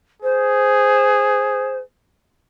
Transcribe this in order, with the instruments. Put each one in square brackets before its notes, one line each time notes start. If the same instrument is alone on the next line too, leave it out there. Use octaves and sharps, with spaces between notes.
[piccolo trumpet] G#4 [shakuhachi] C5